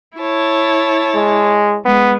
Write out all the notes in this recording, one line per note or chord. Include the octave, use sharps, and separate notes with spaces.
E4 C#5 A5
G#3
G#3 B3